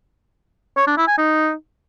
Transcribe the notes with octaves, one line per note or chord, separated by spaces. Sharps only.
C#5
D4
E4
G#5
D#4